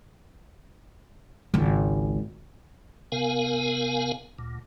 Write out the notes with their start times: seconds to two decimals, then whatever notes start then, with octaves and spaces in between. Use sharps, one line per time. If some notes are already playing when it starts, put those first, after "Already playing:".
1.54 G#1 C#2
3.12 C3 B3 A#4 F5 G#5
4.39 D2 A#2